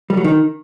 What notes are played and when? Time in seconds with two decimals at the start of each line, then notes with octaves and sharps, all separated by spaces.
0.10 G3
0.17 F#3
0.24 D#3